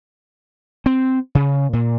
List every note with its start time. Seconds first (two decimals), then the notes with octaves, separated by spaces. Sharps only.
0.86 C4
1.35 C#3
1.73 A#2